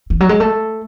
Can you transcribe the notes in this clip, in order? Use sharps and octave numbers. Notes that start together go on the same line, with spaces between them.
E3
F#3
G#3
A3